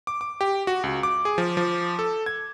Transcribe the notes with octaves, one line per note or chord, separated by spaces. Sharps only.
D6
D6
G4
F#4
C#2
D6
G#4
F3
F3
A4
G#6